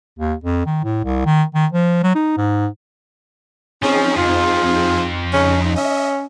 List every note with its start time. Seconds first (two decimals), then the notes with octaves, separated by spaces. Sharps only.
0.19 D#2
0.44 F2
0.66 D#3
0.84 A2
1.04 C2
1.25 D#3
1.54 D#3
1.72 F3
2.03 F#3
2.15 D#4
2.37 G#2
3.83 F3 C4 C#4 D#4 G#4
4.17 F2 F4
5.33 C#3 C#4 D#4
5.76 C#4 D#5 E5